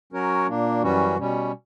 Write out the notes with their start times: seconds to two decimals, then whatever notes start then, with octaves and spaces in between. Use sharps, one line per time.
0.13 F#3 C#4 F#4 A#4 C#5
0.48 A#2 A#3 D4
0.82 F#2 E3 G3 C#4 F#4
1.17 B2 G3 C#4